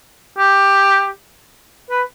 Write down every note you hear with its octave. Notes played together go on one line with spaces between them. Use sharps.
G4
B4